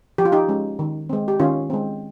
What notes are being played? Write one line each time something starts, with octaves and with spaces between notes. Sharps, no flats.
F3 G4
F4
D#4 G4
G#3 C#4
D#3
G#3 C4
G4
D#3 C#4 F4
G#3 C4